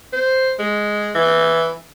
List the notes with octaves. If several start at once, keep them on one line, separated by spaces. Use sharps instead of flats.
C5
G#3
E3